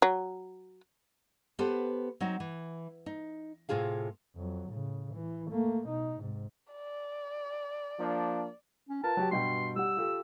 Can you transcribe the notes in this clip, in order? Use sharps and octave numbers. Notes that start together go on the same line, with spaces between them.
F#3
B3 G4 A4 B4 C5
F#3 C4 D#4
E3
D#4
A2 C3 F4 G#4 F5
F2 F#3
A2 C#3
E3
A3 A#3
B2 D#4
G#2 C3
D5
F3 A#3 D4
C#4
F4 A#4 B4 A5
F#3 G4 G5
G2 B2 G5 C6
G3 F#5 E6
F4 G4 A4